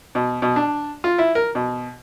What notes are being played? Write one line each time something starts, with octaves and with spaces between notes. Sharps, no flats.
B2
B2
D4
F4
E4
A#4
B2